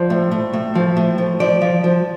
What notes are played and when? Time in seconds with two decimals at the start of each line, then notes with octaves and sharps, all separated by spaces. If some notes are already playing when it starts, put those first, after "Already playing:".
Already playing: F3 D5
0.10 A2
0.31 A2
0.54 A2
0.75 F3
0.97 A2
1.18 F3
1.40 F3 D5
1.62 F3
1.84 F3